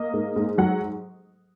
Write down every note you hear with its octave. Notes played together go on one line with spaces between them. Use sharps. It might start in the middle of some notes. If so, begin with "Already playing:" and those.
Already playing: A#3 D#5
G#2
G#2
F#3 F#5